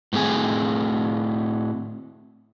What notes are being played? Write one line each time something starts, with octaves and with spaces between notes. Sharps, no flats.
A2 A3 C4 G#4 G#5